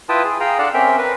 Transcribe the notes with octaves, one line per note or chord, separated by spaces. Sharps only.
E4 F4 B4 G5 A5 D#6
G#4
G#4 F5 G5 A#5
D4 A4 D5 F5 F#5 A5
C4 C#4 A#4 E5 G5
A#4 B4